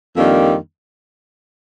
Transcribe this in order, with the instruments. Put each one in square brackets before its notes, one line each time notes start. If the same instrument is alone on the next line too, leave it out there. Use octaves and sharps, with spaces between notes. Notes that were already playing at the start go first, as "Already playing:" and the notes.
[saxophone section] F2 D#3 G3 A#3 D4